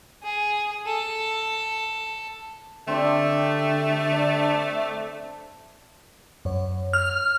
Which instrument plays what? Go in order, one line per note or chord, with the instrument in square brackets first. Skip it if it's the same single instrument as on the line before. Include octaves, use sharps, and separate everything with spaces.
[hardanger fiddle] G#4
A4
[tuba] D3 [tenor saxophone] A3 [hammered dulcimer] C4 D4 G4
[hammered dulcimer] D4
[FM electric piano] F#2 C#5
[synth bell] F6